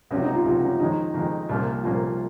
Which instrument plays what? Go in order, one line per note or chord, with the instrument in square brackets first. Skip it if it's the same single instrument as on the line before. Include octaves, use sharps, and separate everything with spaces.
[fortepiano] C#2 C3 F#3 [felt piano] C#4
[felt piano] D#4
F4
[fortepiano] C#2 C3 F#3 [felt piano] F4
[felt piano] C#4
[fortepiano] F2 D#3 G#3 [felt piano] D#4
[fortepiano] F2 D#3 G#3
C2 A#2 F3 A#3 C#4
[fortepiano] C2 A#2 F3 A#3 C#4 [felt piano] F4